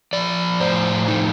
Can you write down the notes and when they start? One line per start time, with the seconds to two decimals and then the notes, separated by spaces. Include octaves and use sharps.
0.13 F3 D5
0.60 A2 C5
1.08 F3 D#4